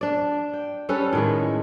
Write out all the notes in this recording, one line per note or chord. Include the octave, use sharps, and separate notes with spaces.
D4 D5
G5
G3 C#4 A4 B4
A2 D#3 G#3